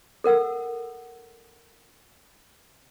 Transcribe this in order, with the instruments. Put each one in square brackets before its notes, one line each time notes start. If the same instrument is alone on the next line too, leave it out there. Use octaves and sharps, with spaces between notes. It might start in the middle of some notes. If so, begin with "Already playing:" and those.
[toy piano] A4 A#4 F#5 E6